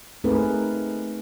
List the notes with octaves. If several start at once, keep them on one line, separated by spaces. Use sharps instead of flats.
A3 C4 D#4 G#4 A#4 B4